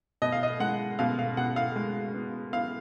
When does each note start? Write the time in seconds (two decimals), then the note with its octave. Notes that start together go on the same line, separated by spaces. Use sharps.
0.22 B2 D#5
0.32 F5
0.43 D#5
0.60 G#3 F#5
0.99 B2 F5
1.19 F5
1.37 B2 F#5
1.56 F5
1.76 G#3
2.14 B3
2.52 B3 F5